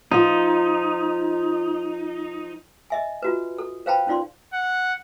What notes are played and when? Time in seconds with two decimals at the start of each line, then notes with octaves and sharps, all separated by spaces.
0.12 F3 D#4 F4
2.90 D#5 E5 G#5
3.22 F4 F#4 B4
3.58 A4
3.86 B4 C5 F5 G5 A5 B5
4.07 C#4 D#4 F4 D5 C6
4.53 F#5